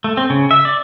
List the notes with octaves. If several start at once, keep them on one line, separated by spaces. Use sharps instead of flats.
A3
C4
C#3
E5
D5